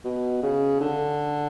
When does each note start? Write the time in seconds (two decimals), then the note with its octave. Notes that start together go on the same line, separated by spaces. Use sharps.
0.05 B2
0.43 C#3
0.81 D3